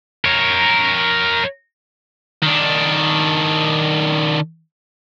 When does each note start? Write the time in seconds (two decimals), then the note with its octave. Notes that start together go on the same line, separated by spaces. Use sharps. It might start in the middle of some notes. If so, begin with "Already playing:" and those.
0.25 A#4 C#5
2.43 D#3 D4